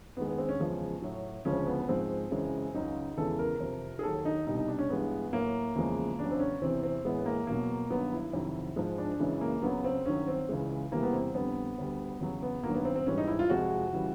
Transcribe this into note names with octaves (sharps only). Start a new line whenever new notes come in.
F#2 D#3 G#3 B3
B3
C4
C#4
E2 C#3 F3 G#3
A2 F#3
D2 C#3 F3 G#3 C#4
B3
G#2 F3 G#3 C4
F#2 C#3 E3 G#3
C#2 C#3 F#3 D#4
E2 C#3 E3 G#3 A4
A#4
F2 C3 F3
G#4
D#2 D#3 F#3 A4
D#4
C2 B2 G3 D#4
D#4
D4
C#4
G2 E3 G#3 B3
A2 F#3 A#3
E2 C#3 F3 G#3
E2 C#3 F#3 D4
C4
C#4
E2 C3 E3 C4
C4
A2 E3 G#3 B3
B3
A#3
E2 B2 F#3 A#3
G2 D#3 F#3 B3
E4
F2 C3 D#3 F#3
G#2 F3 G#3
D4
F#2 C#3 E3 G#3
A#3
C#2 C#3 F#3 B3
C4
G2 D#3 F#3 C#4
C4
C#2 C#3 E3 G#3
E2 C3 E3 G3 A#3
B3
C4
F2 D3 G3 B3
D2 D3 G3
E2 C#3 F#3
B3
G2 D#3 F#3 A#3
B3
C4
C4
G#2 E3 G3 C#4
D#4
E4
F4
F2 C3 F3 G#3 F#4
C#3 E3 G3